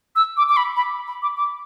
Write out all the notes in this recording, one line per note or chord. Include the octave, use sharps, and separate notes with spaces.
E6
D6
D6
B5
B5
B5
D6
D6